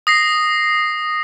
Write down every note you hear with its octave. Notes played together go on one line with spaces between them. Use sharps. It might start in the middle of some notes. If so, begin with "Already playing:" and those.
D#6 A#6 C7